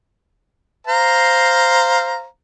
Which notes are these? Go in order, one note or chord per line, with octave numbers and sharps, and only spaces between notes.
C5 F5 A#5